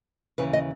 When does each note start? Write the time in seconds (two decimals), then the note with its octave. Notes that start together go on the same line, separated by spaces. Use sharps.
0.38 D#2 C#3 E3 B4
0.53 D#5